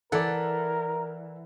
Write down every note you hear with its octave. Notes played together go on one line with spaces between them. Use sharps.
E3 A4 A#4 D5 F#5